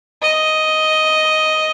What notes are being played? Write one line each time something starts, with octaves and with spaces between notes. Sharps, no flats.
D#5